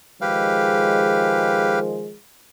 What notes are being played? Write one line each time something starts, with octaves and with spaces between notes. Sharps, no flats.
D#3 F3 G#3 G4 B4 F5